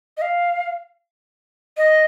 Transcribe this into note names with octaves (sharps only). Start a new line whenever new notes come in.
D#5
F5
D#5